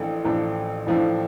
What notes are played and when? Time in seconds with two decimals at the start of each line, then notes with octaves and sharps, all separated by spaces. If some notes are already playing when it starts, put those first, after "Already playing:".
Already playing: A1 A2 F3 A3 D4
0.24 A1 A2 F3 A3 D4
0.86 A1 A2 F3 A3 D4